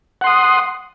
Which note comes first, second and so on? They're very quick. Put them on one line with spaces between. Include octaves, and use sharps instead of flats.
F#5 C6 D#6